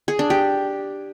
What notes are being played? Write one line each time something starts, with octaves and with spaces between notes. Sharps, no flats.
G#4
D4
G4